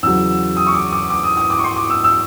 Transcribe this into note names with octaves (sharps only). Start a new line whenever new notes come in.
E2 C#3 F#3 E6
D#6
C#6
D6
D6
D6
D#6
D#6
D6
C#6
C6
D6
E6
E6